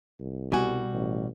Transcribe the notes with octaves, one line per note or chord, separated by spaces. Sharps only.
C2
B2 G3 F#4 G#5
A1